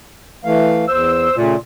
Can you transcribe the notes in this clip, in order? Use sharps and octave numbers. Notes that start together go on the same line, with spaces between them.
E3 A3 F5
E2 C5 E6
A#2 C#3 A3